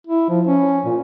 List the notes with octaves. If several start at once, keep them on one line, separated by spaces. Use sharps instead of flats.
E4
F3
C#4
A#2